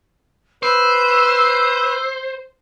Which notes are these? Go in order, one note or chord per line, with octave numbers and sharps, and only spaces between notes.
B4 C5 E6